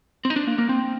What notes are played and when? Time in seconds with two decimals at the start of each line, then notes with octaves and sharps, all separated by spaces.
0.25 C4
0.30 D#4
0.36 D4
0.47 A#3
0.58 A#3
0.69 C4